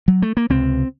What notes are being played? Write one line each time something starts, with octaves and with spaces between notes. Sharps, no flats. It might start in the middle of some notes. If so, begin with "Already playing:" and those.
F#3
A3
A#3
C#2 C3 C4